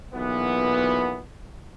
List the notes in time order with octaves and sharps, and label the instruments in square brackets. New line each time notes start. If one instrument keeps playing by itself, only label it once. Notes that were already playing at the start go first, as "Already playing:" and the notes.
[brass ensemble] B1 A#2 E3 B3